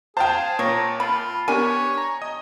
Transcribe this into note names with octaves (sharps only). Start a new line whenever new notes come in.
G#4 C5 F5 G5 A5
A#2 C#5 A#5
F4 B5
B3 D4 G4 A#4 C#5 G#5
A#5
D#5 D#6